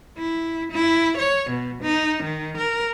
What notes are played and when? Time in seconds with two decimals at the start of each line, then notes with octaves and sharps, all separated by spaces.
0.18 E4
0.72 E4
1.16 C#5
1.49 B2
1.82 D#4
2.23 D#3
2.56 A#4